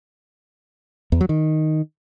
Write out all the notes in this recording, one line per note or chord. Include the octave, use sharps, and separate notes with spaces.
E2
F#3
D#3